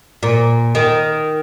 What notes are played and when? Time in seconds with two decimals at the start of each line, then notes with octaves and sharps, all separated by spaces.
0.23 A#2
0.75 D#3